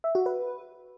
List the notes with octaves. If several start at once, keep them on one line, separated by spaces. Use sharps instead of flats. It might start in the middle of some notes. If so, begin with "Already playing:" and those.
E5
F#4
B4